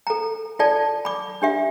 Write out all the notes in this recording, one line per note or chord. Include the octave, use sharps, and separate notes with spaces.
A4 A#5
F4 A4 D5 A5
B5 D6
D4 G4 E5